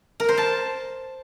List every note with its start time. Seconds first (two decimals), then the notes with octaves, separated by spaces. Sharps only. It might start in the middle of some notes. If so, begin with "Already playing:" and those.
0.20 A#4
0.29 C5
0.38 A5